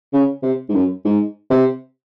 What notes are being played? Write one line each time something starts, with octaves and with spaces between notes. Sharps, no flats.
C#3
C3
G#2
F#2
G#2
C3